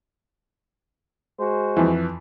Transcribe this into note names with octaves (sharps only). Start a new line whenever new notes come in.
G#3 F#4 C5
F2 E3